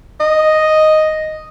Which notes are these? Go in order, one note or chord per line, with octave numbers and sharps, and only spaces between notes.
D#5